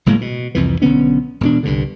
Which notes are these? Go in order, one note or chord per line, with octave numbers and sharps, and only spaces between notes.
F#1 A2 G#3 A#3
B2
C2 F2 E3
B1 D3 B3 C#4
E1 B2 D4
C2 G2 D3